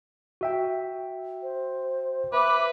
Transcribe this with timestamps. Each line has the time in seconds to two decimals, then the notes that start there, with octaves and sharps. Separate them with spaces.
0.41 F#4 E5 G5
1.43 C5
2.33 B4 E5 D6